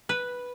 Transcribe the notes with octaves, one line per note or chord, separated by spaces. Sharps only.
B4